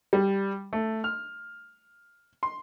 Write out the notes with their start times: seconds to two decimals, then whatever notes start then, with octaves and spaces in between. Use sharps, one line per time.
0.13 G3
0.73 A3
1.04 F6
2.43 C6